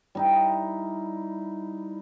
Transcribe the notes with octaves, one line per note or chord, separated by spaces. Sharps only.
G3 D#4 E4